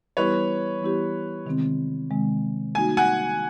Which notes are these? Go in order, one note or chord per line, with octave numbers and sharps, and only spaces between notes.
E3 G3 B3 E4 G4 B4 C#5
E3 G3 B3 E4 G4
C3 D#3 G#3 C4
C3 D#3 G#3 C4
G3 A#3 D#4 F#4 G#5
F#5 G#5